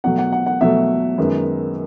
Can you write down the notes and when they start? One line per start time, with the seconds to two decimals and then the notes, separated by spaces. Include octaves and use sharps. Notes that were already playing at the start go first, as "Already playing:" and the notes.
0.04 B2 F#3 A3 F#5
0.18 F#5
0.32 F#5
0.46 F#5
0.61 B2 F#3 A3 E5
1.18 F#2 D#3 G#3 B3